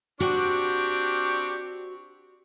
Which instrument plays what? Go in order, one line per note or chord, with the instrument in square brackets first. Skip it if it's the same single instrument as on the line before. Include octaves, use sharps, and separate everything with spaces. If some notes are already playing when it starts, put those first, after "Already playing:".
[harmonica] C4 D4 G4 [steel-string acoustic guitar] F#4 G5 [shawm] C#6